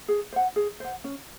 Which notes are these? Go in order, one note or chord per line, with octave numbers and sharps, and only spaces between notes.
G#4
C5 F#5
G#4
C5 F#5
C#4